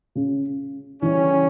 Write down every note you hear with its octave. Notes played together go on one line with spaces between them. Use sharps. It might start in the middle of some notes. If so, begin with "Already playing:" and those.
C#3
C#3 E3 G3 C#4